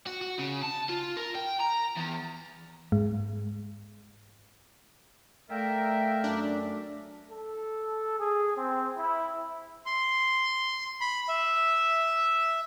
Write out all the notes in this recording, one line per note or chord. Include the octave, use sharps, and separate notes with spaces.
F#4
F#4
C#3
A5
F4
A#4
G5
A#5
E2
G#2 G#3
A3 A#4 D5 E5 F5 G5
F#2 D4
A4
G#4
C4
E4
C6
B5
E5